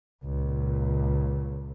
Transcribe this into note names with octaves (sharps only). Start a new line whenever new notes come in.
C#2 A#2